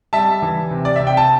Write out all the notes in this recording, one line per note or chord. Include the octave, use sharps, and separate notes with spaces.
G3 E5 A5
E3
C3
D5
C3 E5
G5
A5